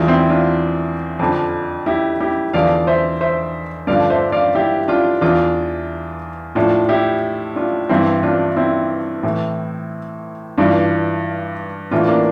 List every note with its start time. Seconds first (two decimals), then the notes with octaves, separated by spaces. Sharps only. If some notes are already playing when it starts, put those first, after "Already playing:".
Already playing: E2 E3 D4 F4
0.08 C4 E4
0.30 D4 F4
1.19 F2 D3 F3
1.86 E4 G4
2.20 E4 G4
2.53 E2 D3 F3 D5 F5
2.87 C5 E5
3.21 C5 E5
3.87 G2 D3 F3 D5 F5
4.10 C5 E5
4.32 D5 F5
4.55 E4 G4
4.88 D4 F4
5.21 E2 E3 D4 F4
6.55 A2 F3 D4 F4
6.89 E4 G4
7.56 D4 F4
7.89 G2 E3 C4 E4
8.23 D4 F4
8.56 C4 E4
9.23 A2 E3
10.58 G2 E3 D4 F4
11.91 A2 E3 D4 F4
12.08 A#3 D4